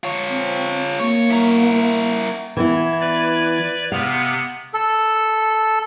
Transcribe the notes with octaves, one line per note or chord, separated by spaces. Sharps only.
F4 C#5
C4
A2 A#3 C#5
E4 A#4
E3 B3 E4 G#6
B4 D5 G#6
C3 B3 F5
A4